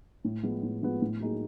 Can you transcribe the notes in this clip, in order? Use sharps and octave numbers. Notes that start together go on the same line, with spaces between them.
A2
F3 G#3 B3
A2
F3 G#3 B3
A2
F#3 A#3 D#4 G#4